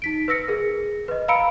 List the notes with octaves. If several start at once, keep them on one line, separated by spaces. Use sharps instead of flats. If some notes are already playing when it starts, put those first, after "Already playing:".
D#4 B6 D7
B4 E6 A#6 C#7
G#4 A#4
B4 D#5
F5 A#5 B5 E6 C#7 D7